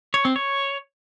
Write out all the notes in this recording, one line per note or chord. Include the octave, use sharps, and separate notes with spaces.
C#5
C4
C#5